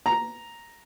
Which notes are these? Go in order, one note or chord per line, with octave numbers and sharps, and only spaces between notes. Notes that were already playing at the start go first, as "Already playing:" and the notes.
A#5